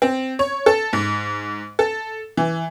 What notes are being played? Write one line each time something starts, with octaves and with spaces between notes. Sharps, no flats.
C4
C#5
A4
G#2
A4
E3